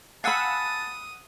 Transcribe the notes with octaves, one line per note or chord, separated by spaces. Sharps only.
F5 F#5 G#5 A5 B5 D#6 E6